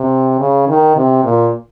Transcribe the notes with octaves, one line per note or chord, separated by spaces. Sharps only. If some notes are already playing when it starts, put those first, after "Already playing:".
Already playing: C3
C#3
D#3
C3
A#2